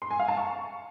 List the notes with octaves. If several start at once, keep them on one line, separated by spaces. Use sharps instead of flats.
C6
G#5
F5
A5
C#6